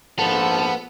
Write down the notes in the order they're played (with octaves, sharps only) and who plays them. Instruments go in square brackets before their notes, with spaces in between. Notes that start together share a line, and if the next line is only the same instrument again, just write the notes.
[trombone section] A#1 G#2 F3 [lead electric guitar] B3 [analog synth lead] A4